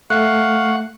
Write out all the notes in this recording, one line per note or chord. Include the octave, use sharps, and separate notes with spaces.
A3 F5 F#5 C#6 F#6